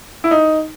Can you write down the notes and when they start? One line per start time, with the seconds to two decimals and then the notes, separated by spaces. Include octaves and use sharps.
0.24 E4
0.31 D#4